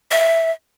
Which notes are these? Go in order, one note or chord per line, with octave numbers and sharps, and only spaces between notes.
E5